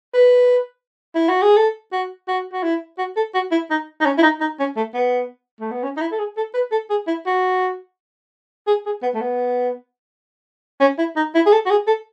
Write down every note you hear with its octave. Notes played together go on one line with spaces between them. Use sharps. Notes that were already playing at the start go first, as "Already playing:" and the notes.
B4
E4
F#4
G#4
A4
F#4
F#4
F#4
E4
F#4
A4
F#4
E4
D#4
D#4
C#4
E4
D#4
D#4
C#4
A3
B3
A3
B3
C#4
D#4
E4
A4
G#4
A4
B4
A4
G#4
E4
F#4
G#4
G#4
B3
A3
B3
C#4
E4
D#4
E4
G#4
A4
F#4
G#4
A4